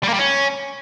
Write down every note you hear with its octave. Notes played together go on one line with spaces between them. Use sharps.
G3
A#3
G3
C#4